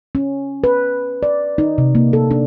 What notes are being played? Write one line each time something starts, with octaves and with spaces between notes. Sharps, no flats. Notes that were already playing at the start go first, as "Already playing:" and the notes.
C#4
B4
D5
D#4
C3
A#3
A4
D4